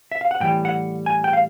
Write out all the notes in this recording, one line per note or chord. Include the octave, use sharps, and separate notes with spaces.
E5
F5
F#5
A2 E3 G3 G5
F#5
G#5
G5
F5